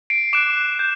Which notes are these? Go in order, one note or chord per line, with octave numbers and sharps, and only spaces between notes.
C7 D7
D6 F#6 D7 E7
G6